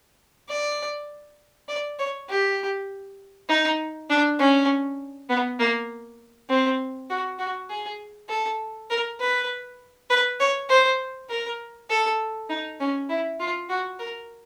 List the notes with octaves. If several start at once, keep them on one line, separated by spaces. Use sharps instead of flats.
D5
D5
C#5
G4
D#4
D4
C#4
B3
A#3
C4
F#4
F#4
G#4
A4
A#4
B4
B4
C#5
C5
A#4
A4
D#4
C#4
E4
F4
F#4
A#4